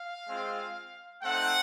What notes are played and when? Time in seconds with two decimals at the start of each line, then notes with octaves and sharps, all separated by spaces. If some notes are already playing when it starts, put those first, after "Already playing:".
Already playing: F5
0.28 G#3 C4 F4
1.22 A3 C4 D#4 F#5